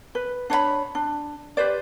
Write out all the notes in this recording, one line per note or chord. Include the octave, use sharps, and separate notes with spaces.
B4
D4 C#5 D5 B5
D4
G4 B4 C5 D5